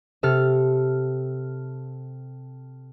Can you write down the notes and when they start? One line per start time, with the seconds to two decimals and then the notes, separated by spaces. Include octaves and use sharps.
0.23 C3 A4 F6